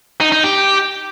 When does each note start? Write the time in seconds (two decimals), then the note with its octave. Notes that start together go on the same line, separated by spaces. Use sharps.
0.21 D#4
0.32 D#4
0.44 G4